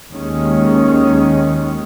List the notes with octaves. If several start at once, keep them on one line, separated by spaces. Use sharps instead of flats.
D#2 D#3 G#3 C#4